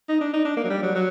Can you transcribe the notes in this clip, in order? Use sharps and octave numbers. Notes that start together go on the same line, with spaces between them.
D#4
D4
D#4
D4
A#3
F#3
G3
F#3
F#3